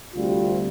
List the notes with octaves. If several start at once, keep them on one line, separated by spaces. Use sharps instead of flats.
D2 C3 G3 F4